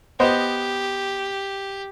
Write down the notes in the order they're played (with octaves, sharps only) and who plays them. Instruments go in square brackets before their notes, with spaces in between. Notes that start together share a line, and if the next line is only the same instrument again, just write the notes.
[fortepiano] B3 C5 D#5 [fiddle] G4